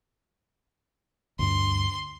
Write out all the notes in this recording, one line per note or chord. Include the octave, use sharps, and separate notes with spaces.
D2 G2 D4 C6